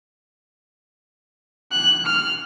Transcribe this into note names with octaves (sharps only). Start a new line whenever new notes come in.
F#6
F6